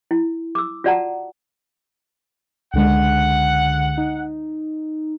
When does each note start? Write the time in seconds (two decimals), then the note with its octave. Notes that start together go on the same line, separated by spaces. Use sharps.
0.11 E4
0.55 D6 E6
0.84 F4 F#4 D5 F#5 A5 A#5
2.74 C#2 D3 G#3 F#5
3.98 D#4